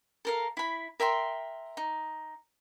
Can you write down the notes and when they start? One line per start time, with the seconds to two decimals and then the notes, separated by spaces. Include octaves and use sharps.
0.25 A4 A#4 F5
0.57 E4 B5
1.00 A#4 E5 G5 C6
1.77 D#4